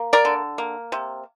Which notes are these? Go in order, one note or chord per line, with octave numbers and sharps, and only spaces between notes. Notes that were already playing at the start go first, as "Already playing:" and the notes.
Already playing: A#3
A#4 D5
D3
A#3
C3